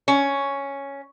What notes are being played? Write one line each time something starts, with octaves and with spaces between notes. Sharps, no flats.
C#4